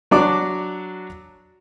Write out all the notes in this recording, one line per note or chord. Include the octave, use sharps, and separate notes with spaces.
F#3 D4 F#4 D5 D6